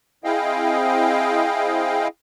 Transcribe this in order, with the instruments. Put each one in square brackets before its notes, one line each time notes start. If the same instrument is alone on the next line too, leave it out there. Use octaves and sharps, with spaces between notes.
[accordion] C4 E4 G#4 D#5 F5 G5